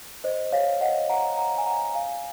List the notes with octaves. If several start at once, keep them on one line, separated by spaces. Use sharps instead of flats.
C5 D#5
C#5 F5
D#5 F#5
F#5 A#5
F#5 A#5
G#5
F#5 A#5
F5 G#5